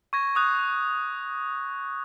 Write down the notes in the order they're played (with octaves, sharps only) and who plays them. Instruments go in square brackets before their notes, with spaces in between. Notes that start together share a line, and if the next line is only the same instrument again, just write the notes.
[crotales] C#6 G#6 A#6
C#6 D#6 F#6